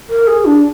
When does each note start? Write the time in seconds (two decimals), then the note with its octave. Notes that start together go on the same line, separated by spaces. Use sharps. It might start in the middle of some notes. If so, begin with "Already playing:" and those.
0.09 A#4
0.27 G#4
0.45 D4